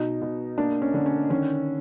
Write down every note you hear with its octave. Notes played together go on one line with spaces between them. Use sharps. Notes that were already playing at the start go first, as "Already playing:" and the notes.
Already playing: B2 D#4
B2
A#3 D4
C#4
D3
C#4
D#3 C#4